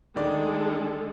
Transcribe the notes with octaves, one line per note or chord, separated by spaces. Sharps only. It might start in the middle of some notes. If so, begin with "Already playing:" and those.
D2 D#3 G#3 D4 A4 D5